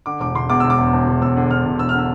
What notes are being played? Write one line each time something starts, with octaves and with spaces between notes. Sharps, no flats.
D3 D6
E1 D6
E1 C6
E2 D6
E1 E6
D6
E2
E1
E1
E1 E6
D3
D3 F6
E1
E1 E6
F6
D3 E6